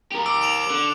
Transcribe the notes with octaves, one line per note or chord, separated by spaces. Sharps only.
G4 A#4
D6 E6 D7
D7 E7 F7
D3